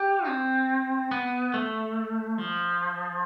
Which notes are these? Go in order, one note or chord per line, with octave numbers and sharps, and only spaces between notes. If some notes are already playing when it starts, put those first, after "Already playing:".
Already playing: G4
C4
B3
A3
F3